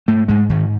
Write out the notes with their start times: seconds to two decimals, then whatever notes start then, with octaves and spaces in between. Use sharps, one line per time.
0.08 G#2 A3
0.28 G#2 G#3
0.50 G#2 D#3